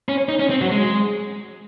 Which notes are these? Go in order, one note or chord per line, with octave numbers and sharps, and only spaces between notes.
C#4
D#4
C#4
C4
F#3
G#3